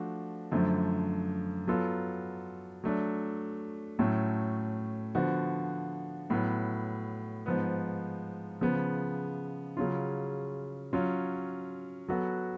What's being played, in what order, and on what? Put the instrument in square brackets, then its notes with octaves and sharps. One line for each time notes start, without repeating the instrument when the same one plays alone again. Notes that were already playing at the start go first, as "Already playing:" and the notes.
Already playing: [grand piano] F3 A3 D4 F#4
F#2 D3 F3 A3
F#3 B3 F4 A4
F#3 A3 D4
A2 F#3 A3 C#4
D3 F3 B3 F#4
A2 F#3 B3
G#2 F3 B3
C#3 F3 B3
C#3 F#3 C#4 F4
F#3 C#4 F4
F#3 B3 F#4 A4